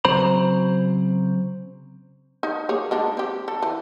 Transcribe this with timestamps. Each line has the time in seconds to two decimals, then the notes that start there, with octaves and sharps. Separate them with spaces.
0.05 C#3 F#3 C4 C5 A#5 B5
2.43 D#4
2.69 A#3 G#4 C#5
2.91 G#3 D4 D#4
3.17 C4 G4
3.48 A4
3.63 E3